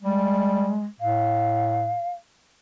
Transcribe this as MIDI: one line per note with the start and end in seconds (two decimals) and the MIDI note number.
0.03 0.76 55
0.03 0.84 56
1.00 1.96 45
1.00 2.10 77